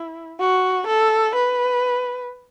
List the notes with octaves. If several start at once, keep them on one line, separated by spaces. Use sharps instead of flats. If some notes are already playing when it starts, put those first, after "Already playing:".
Already playing: E4
F#4
A4
B4